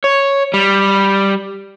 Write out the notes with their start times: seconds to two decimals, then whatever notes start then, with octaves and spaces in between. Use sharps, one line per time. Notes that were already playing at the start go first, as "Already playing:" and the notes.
0.04 C#5
0.54 G3